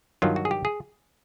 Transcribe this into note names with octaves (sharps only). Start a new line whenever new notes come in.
G2 D#3 F#3 F4
F#4
G#4
G4
G#4